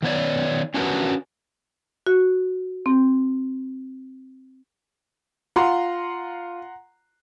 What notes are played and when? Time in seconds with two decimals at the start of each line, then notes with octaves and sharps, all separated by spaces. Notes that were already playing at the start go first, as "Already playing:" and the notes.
0.02 D#3 B3 C#5 D5
0.74 C#4 D4 F#4 A#4 B4
2.07 F#4
2.86 C4
5.56 F4 F#5 A#5 C6